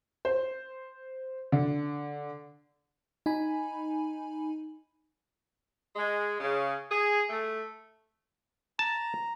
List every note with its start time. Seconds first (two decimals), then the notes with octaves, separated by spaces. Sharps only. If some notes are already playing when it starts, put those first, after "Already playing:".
0.25 C5
1.52 D3
3.26 D#4 G#5 B5
5.95 G#3
6.40 C#3
6.89 G#4
7.29 A3
8.79 A5 A#5